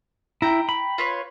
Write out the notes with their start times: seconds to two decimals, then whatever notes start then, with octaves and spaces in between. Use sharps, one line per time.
0.42 E4 G5 A#5
0.69 B5
0.98 F4 B4 C#5